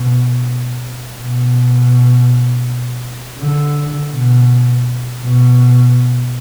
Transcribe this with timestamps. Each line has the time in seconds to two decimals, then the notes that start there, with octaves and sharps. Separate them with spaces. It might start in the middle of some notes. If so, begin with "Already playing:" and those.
Already playing: B2
1.18 B2
3.38 D3
4.12 B2
5.22 B2